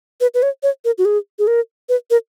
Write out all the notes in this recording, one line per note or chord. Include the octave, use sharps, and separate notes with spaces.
B4
B4
C#5
C#5
A#4
F#4
G#4
G#4
A#4
B4
A#4